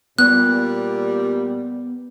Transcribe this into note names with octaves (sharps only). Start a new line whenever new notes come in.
A#2 G3 B3 F#6